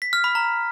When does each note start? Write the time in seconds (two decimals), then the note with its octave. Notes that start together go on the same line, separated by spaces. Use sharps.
0.02 B6
0.13 F6
0.24 B5
0.35 A#5